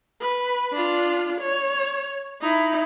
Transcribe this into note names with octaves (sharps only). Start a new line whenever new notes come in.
B4
D4 F4
C#5
D#4 E4